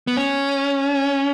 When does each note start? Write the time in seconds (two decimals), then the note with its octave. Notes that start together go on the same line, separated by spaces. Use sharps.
0.07 B3
0.16 C#4